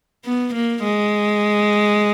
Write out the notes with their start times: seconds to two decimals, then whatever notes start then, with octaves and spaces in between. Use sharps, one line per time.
0.25 B3
0.54 A#3
0.84 G#3